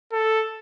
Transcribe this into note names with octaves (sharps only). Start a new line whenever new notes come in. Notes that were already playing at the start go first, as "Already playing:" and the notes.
A4